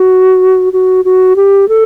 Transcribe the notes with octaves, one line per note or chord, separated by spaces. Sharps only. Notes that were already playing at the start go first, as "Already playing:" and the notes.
Already playing: F#4
F#4
F#4
G4
A4